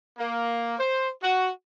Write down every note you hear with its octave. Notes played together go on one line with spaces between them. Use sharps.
A#3
C5
F#4